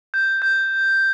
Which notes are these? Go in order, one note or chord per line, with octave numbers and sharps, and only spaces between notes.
G6
G6